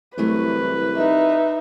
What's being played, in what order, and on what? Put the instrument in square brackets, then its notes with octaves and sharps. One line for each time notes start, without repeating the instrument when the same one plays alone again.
[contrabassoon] C2 [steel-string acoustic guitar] E3 F#3 A3 [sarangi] B4
[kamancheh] D#4 E5